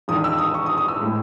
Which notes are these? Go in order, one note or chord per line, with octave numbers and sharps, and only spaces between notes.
E1 E2 D#3 D#6
E6
D#6
C#6
D#6
D#6
E6
A2 G#3